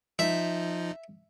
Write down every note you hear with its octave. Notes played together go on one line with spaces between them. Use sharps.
F3 D#4 E5